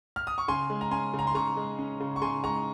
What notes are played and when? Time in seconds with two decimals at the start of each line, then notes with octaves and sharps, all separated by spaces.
0.16 F6
0.27 D#6
0.38 C#6
0.48 C#3 G#5 C6
0.70 G#3
0.81 A#5
0.91 C#4 G#5 C6
1.13 C#3
1.19 A#5
1.27 C6
1.35 C#3 A#5 C#6
1.57 G#3
1.79 C#4
2.00 C#3
2.16 C#6
2.22 C#3 G#5 C6
2.43 G#3 A#5 C#6